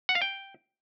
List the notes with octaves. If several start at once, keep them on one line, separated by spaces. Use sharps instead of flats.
F#5
F5
G5